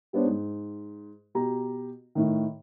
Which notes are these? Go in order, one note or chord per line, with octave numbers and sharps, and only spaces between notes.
G3 B3 D4 C5 C#5
G#2
B2 G4 A#5
A2 D#3